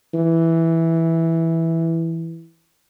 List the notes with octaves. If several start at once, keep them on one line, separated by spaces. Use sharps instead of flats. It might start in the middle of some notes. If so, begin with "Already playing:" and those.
E3